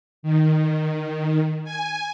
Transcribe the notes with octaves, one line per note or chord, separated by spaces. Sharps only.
D#3
G#5